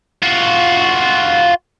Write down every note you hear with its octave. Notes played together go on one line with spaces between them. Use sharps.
F4 F#4